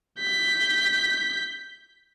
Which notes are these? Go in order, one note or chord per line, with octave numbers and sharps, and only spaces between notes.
G6 B6